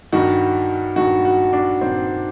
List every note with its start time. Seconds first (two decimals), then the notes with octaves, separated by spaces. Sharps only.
0.12 G2 D#3 F#4
0.96 G2 D#3 F#4
1.25 F#4
1.53 D4
1.81 G2 D#3 C4